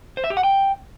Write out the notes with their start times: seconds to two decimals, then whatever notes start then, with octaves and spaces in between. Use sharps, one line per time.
0.17 C5
0.24 E5
0.30 G4
0.37 F#5
0.43 G5